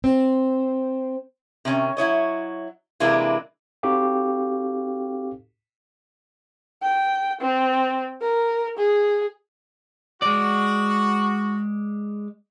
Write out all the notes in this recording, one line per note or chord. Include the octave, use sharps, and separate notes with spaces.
C4
C3 D#3 C#4
F#3 E4 C#5 D#5
C3 E3 G#3 A#3 D4 E4
C4 D#4 F#4 G4 A4 F5
G5
C4
A#4
G#4
G#3 F#4 D5